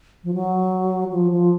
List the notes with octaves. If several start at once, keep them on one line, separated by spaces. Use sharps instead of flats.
F3
F#3
F3
F3